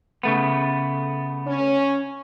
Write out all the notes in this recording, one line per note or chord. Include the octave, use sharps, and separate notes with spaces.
C#3 A3 B3
C#4